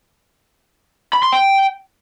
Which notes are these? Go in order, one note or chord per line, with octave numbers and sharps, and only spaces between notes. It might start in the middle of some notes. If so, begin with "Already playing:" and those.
B5
C6
G5